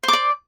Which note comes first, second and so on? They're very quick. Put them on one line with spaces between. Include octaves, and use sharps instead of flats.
C5 D6 D5